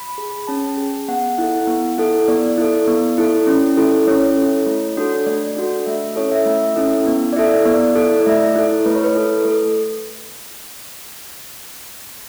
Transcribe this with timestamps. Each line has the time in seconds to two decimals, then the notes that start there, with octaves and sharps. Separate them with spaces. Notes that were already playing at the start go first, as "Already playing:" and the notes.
Already playing: B5
0.18 G#4
0.47 C#4 A5
0.77 G#4
1.08 B3 F#5
1.38 E4 A4
1.67 B3
1.98 E4 A4
2.28 B3 D5
2.58 E4 A4
2.87 B3
3.18 E4 A4
3.47 C#4
3.77 E4 A4
4.07 C#4 C#5
4.36 A4
4.42 E4
4.66 A3
4.97 D4 F#4 A4
5.26 A3 D5
5.57 D4 F#4 A4
5.86 A3 E5
6.16 C#4 E4 A4 C#5
6.32 E5
6.46 A3 E5
6.76 C#4 E4 A4
7.07 B3
7.33 D5
7.37 E4 A4 E5
7.65 B3 D5
7.95 E4 A4
8.21 D5
8.26 A3 E5
8.55 E4 A4
8.86 A3 B4
8.95 C#5
9.04 B4
9.15 E4 A4
9.45 A3 A4